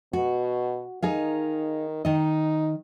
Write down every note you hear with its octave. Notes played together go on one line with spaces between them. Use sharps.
B2 F#4
D#3 D#4 G#4 F5
D#3 D#4 D#5